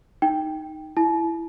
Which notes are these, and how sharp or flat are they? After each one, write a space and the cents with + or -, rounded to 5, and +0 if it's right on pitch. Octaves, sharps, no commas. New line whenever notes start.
D#4 +0 G5 +5
E4 +10 A5 -45